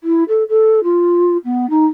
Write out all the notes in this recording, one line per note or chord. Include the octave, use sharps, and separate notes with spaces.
E4
A4
A4
F4
B3
D#4